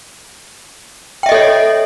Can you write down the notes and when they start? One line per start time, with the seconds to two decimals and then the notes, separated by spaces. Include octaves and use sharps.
1.23 G5
1.26 E5
1.29 D#5
1.32 A4
1.35 C#5